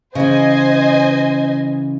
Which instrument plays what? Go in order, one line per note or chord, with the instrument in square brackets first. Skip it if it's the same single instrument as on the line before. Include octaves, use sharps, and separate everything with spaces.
[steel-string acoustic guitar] C#3 E3 [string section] C5 D#5 G#5